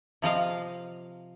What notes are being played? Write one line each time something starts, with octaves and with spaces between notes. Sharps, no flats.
C3 F3 D#5 F5